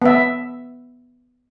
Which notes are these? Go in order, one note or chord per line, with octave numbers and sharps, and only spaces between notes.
B3 E5